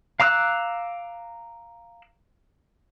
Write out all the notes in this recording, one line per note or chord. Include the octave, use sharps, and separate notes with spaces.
F5 A#5 D6 E6 F#6